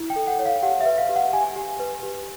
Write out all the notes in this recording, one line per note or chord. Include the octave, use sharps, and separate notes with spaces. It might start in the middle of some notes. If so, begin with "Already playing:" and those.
Already playing: E4
G5
A4
F#5
C#5
F5
G4 F#5
B4 E5
F5
G4
F#5
G4 G#5
G4
B4
G4